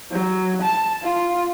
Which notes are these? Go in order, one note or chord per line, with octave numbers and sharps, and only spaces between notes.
F#3
A5
F4